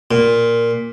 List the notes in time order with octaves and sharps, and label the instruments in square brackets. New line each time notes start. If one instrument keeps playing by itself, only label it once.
[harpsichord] A#2